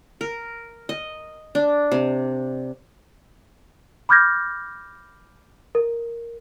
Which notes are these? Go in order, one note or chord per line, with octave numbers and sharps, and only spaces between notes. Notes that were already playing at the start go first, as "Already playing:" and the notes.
A#4
D#5
D4
C3
B5 D6 F6 G6 G#6 A#6
A#4